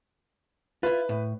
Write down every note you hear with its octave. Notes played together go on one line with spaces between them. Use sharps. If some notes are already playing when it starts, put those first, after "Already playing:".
E4 F4 B4
A2